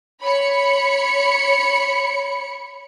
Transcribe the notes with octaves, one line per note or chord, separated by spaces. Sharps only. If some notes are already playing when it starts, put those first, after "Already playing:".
C#5 B5 C#7